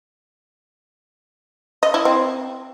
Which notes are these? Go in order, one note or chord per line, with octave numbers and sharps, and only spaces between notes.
D#5
E4
C4